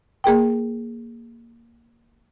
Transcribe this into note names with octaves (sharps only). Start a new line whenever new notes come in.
A#3 G#4 A#4 G5